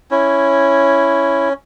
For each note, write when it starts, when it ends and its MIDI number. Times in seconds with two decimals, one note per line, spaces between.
0.11 1.53 61
0.11 1.49 64